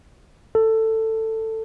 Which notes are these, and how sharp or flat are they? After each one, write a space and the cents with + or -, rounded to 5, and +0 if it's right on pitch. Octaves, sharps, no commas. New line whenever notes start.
A4 +15